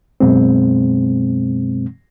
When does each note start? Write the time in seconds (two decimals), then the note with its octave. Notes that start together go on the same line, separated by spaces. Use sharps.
0.20 F#2 B2 G#3 C4